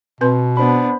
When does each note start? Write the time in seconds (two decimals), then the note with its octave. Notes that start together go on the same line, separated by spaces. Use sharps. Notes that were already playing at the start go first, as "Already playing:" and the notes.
0.21 B2 C4 B4 C6
0.57 B3 D4 C5 B5